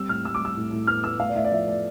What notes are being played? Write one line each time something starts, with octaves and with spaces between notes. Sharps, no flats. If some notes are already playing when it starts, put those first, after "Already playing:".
Already playing: G3 C4 E6
A2 F6
G3 E6
D6
G3 E6
A2
A2
B3 F6
B3 E6
A2 F5
D5
A2 E5
D5
F3 E5
A3 D5